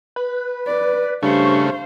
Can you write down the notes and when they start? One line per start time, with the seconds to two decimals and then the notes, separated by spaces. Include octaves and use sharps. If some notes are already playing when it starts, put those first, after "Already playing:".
0.16 B4
0.66 D5
1.23 G2 C#3 A3 C5 F5 C#6